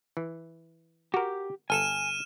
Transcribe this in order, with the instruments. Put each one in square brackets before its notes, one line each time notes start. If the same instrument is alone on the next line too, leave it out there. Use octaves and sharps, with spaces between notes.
[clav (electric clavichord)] E3
[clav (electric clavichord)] F#4 A#4 [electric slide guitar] G4
[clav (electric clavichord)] G1 A4 [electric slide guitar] G#5 [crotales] F6 D#7 E7